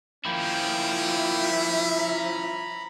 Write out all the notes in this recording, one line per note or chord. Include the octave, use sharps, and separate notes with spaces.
F3 A#3 C#4 E4 G5
E5
A#5 B5